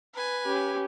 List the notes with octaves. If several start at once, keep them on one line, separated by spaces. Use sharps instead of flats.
B4 G#5
C#4 G4